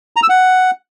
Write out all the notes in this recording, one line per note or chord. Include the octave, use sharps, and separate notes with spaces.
A#5
E6
F#5